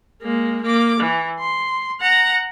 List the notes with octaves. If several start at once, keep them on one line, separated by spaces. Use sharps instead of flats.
G#3 A#3
A#3 D6
E3
C6
F#5 A#5